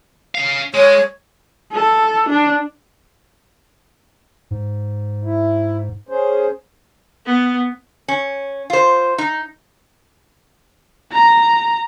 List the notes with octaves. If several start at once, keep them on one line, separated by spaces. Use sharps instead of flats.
C#4 F5
G#3 C#5
A4
D4
G#2
E4
C#4 G#4 C5
B3
C#4
F4 C5
D#4
A#5